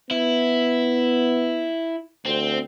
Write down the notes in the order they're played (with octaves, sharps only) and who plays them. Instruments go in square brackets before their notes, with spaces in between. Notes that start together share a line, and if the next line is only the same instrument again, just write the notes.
[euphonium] B3 [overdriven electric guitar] E4
[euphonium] D2 [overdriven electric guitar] C4